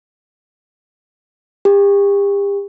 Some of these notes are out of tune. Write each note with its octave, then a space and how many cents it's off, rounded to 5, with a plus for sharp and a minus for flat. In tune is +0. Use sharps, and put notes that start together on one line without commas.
G4 +40